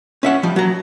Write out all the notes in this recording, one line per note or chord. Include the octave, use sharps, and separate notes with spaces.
C#4 E5 F#5
F3 G3
F#3 A#5